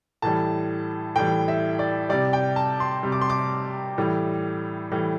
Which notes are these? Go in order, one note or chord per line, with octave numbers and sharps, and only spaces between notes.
A2 E3 G3 A5
A2 E3 G3 G5
E5
D5
C3 G3 D5
G5
A5
C6
C3 G3
D6
C6
D6
A2 E3 G3
A2 E3 G3